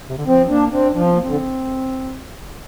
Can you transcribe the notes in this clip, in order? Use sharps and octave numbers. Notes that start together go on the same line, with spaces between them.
C3
D3
F3 C4
A#3 D4
C4 D4
F3 D4
C4
A#3
C4
D3